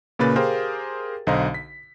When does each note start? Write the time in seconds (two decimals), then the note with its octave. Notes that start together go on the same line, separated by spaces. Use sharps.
0.19 A#2 C#3 A#3 B4 A6
0.36 G4 G#4 A#4 C5 F5 G5
1.27 B1 D3 C5 D#5 F5 A#5
1.54 B6